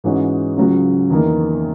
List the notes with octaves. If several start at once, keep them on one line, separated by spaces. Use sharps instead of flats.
G#2 E3 G#3 C#4 F#4
C#2 C#3 F#3
E2 D#3 A#3